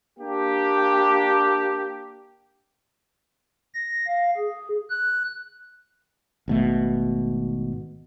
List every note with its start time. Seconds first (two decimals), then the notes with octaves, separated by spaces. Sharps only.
0.19 A#3 D4 G4
3.74 A#6
4.07 F5
4.37 G#4
4.90 F#6
6.48 G#1 B2 A3